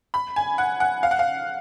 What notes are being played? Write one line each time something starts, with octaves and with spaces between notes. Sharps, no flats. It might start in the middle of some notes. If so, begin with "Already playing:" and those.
B5
G#5
F#5
F#5
F5
F#5
F5